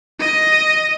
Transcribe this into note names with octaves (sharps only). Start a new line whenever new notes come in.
D#5